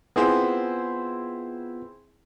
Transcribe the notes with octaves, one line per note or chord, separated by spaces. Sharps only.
B3 C4 E4 F4 G#4